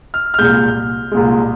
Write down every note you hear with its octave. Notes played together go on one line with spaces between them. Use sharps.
F6
F6
C2 A#2 G#3 G6
C2 A#2 G#3